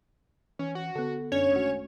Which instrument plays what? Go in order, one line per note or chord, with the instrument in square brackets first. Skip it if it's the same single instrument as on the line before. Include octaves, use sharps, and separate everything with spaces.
[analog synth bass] E3 [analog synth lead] C#4
[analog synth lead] F#4
[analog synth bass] D3 [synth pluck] B3 A4
[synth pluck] F#2 D4 [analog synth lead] C#4 [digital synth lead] C#5
[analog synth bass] G#1 [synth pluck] G#3 A3 F#4